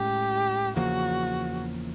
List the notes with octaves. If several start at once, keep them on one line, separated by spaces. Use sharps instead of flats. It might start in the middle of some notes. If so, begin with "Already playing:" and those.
Already playing: A2 G#3 C#4 G4
E2 C#3 F3 A#3 F#4